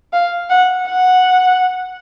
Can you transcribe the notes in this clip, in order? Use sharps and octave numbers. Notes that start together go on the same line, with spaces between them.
F5
F#5
F#5